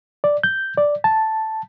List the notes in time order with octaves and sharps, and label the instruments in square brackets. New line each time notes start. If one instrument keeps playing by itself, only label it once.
[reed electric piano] D5
G6
D5
A5